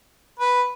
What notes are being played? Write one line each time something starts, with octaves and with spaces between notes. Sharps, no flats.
B4